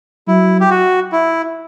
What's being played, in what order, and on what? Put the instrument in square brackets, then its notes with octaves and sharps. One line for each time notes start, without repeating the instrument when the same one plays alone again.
[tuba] F#3 [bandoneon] E4
[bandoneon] G4
F#4
E4